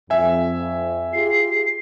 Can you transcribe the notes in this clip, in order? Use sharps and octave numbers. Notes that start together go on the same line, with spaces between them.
F2 E5 G#5
F4 G4 G#4 C7